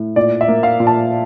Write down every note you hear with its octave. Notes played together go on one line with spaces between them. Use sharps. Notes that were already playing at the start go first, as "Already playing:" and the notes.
Already playing: A2
A#2 D5
E5
A#3
F5
A#2
A5